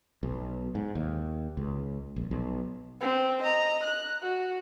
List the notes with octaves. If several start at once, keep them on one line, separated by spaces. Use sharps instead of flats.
B1
G#2
D#2
C#2
A#1
B1
C4
D#5 A#5
F#6
F#4